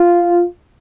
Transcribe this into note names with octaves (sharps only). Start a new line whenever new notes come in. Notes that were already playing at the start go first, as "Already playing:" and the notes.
Already playing: F4